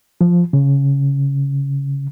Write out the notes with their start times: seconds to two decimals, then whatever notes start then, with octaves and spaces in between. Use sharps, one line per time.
0.21 F3
0.53 C#3